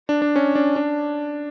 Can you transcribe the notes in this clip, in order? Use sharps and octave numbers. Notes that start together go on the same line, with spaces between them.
D4
D4
C#4
D4
D4